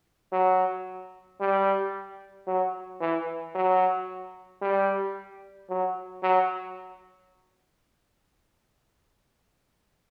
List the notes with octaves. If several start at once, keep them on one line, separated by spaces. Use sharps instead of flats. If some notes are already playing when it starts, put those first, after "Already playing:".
F#3
G3
F#3
E3
F#3
G3
F#3
F#3